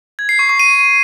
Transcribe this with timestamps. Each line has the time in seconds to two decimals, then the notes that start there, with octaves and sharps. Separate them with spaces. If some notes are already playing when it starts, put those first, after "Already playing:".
0.19 G#6
0.29 C7
0.39 C#6
0.49 C#6
0.59 D#7